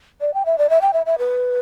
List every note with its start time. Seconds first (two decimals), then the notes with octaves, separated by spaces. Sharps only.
0.21 D5
0.34 G5
0.46 E5
0.58 D5
0.70 E5
0.81 G5
0.93 E5
1.06 E5
1.18 B4